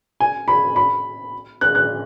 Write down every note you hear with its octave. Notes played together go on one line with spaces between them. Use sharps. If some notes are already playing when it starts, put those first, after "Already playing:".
G#5
B5
B5
F#6
F#6